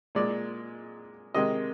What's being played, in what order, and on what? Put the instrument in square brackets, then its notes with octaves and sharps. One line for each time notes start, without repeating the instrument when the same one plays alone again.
[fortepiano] A#2 G#3 D5
C3 D#3 G#3 D#5